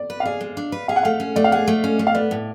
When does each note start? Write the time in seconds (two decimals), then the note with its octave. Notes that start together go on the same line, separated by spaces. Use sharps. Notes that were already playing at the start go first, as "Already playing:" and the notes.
Already playing: D5
0.10 B4
0.20 F5
0.25 G#4 D5
0.41 G#3
0.57 D4
0.72 B4
0.88 G#4 F5
0.96 F#5
1.03 A3 F5
1.20 C#4
1.36 A3 D5
1.44 F5
1.52 G#4 F#5
1.68 A3
1.84 C#4
1.99 A3
2.07 F5
2.14 B3 D5
2.31 A2